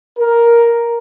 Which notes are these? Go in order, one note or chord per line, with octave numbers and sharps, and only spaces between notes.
A#4